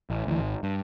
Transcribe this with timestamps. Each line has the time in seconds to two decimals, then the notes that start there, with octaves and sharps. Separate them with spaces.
0.10 A1
0.27 D2 E3
0.39 G#1
0.63 G2